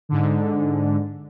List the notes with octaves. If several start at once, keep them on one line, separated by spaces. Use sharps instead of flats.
G#2 D3